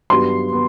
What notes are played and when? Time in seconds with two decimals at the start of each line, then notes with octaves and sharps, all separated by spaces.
0.10 G2 F#3 B3 C6
0.53 B3